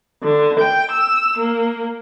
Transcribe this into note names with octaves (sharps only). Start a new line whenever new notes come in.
D3
G5
E6
A#3